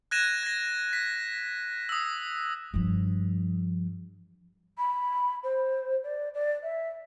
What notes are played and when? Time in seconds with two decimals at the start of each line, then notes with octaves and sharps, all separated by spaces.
0.11 F#6 G#6 A#6 D#7 E7
0.43 G#6 A#6
0.93 B6
1.89 D#6 E6
2.74 G2 F3
4.78 B5
5.43 C5
6.03 D5
6.34 D5
6.63 E5